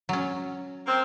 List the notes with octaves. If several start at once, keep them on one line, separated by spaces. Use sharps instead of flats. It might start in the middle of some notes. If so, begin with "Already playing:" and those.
F#3 C#4
A#3 C4